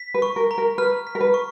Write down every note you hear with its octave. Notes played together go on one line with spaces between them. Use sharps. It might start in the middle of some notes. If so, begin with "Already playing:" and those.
Already playing: B6
B4
C#6
A#4
A#5
A#4
B4 F6
B6
A#4
B4
C#6